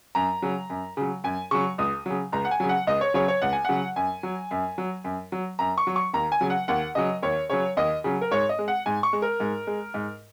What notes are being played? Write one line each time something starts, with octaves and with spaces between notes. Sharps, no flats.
F#2 A#5
C#3 F#3
F#2
C#3 F#3
F#2 G#5
C#3 F#3 C#6
C#2 D#6
C#3 F#3
C#2 A#5
F#5
G#5
C#3 F#3
F#5
C#2 D#5
C#5
C#3 F#3 C#5
C#5
C#2 F#5
G#5
C#3 F#3 F#5
F#2 G#5
F#3
F#2
F#3
F#2
F#3
F#2 A#5
C#6
F#3
C#6
D#2 A#5
G#5
C#3 F#3
F#5
D#2 F#5
C#3 F#3 D#5
D#2 C#5
C#3 F#3 C#5
D#2 D#5
C#3 F#3
A#4
G#2 C#5
D#5
G#3
F#5
G#2 G#5
C#6
G#3
A#4
G#2
G#3
G#2